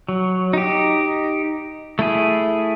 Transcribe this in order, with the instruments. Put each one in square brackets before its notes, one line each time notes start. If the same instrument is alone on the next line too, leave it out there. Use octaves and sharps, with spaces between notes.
[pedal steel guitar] F#3
D#4 G4
A3 E4 G#4